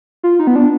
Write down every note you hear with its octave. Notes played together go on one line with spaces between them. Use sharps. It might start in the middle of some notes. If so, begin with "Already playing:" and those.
F4
D#4
B3
D4